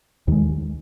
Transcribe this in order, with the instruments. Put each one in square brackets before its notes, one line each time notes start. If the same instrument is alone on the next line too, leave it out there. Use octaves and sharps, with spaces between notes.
[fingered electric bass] D#2 D#3 G#3